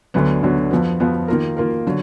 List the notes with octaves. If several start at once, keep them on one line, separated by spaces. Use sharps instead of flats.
D2 D3 F#3 B3
D2 D3 F#3 B3
F2 F3 B3
F2 F3 B3
D#3 A#3 F4 A#4
D#3 A#3 F4 A#4
D3 F#3